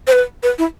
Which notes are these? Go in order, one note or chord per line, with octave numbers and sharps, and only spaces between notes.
C5
B4
B4
E4